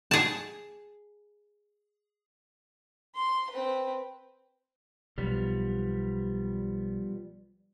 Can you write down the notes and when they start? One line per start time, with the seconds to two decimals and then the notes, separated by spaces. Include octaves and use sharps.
0.11 G#4 A5
3.15 C6
3.50 C4 B4
5.18 B1 F3 G3 B3